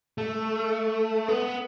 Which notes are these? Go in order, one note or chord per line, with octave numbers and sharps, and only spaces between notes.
A3
B3